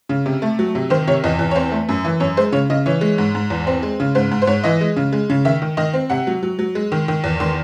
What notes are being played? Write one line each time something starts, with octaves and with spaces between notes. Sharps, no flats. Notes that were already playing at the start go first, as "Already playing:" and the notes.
C#3
C3
A3
F#3
C3
D#3 C5
C3 C#5
E2 D#5
E2
C#5
C4 C5
A3
F#2
E3
F#2 C#5
G#3 C5
C#3 C#5
C#3 D#5
E3 C#5
G#3
G#2
G#2
E2
C4
G#3
C#3
G#2 C5
G#2
C5
G#2 C#5
E3 D#5
G#3
C#3
G#3
C#3
D#3 E5
D#3
D#3 D#5
C4
C3 F#5
F#3
F#3
F#3
G#3
D#3
D#3
E2
D#3 C6